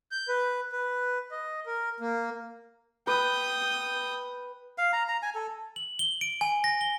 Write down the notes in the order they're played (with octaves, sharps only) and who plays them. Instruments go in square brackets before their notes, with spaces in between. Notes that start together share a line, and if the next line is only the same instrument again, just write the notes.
[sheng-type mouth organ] G6
B4
B4
D#5
A#4
A#3
[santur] B4 [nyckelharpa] G5 D#6
[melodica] F5
A#5
A#5
G#5
A4
[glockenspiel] F#7
G7
D7
G#5
A#6
G7